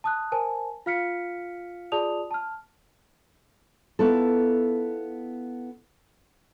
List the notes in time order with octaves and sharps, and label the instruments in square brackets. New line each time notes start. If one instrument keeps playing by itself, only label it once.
[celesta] A5 D#6 F#6
A#4 C5 G#5 A5
F4 F5 F6 B6 C#7
F4 G#4 D5 A5 D#6 F7
A5 F6
[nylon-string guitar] B3 E4 F4 A4